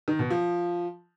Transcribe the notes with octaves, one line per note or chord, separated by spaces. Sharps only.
D#3
B2
F3